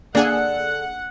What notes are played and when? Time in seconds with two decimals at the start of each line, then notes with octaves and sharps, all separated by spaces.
0.15 D3 A#3 D4 G#4 A4 E5 F#5